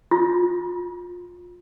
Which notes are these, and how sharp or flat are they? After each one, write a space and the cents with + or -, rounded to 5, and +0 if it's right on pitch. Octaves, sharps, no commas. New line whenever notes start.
F4 +25